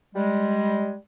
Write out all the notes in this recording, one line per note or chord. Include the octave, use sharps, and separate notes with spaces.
G3 G#3